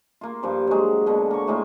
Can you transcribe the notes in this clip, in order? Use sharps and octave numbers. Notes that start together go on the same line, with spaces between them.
A#3 F4
G2 F3 G3 D6
F#3 G#3
B2 D3 A#3
A#3 C#6
A2 G#3 A#3 F4